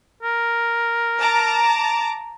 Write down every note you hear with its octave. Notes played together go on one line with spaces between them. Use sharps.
A#4
A5 A#5 D6